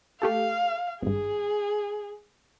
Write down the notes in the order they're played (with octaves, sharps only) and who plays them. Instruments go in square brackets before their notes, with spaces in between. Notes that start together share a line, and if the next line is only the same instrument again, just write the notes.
[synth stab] A3 G4 A4 [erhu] F5
[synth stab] G#1 G2 [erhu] G#4